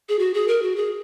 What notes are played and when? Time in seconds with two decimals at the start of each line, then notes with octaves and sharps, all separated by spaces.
0.09 G#4
0.19 F#4
0.34 G#4
0.48 A#4
0.63 F#4
0.76 G#4